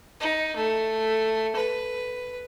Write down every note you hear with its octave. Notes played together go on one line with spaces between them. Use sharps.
D#4
A3
B4